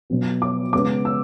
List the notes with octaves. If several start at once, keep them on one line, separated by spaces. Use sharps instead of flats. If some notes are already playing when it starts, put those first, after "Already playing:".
B2 F#3 B3
D6
C#3 G#3 B3 D6
E6